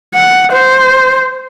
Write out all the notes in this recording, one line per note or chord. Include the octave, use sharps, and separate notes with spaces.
F#5
C5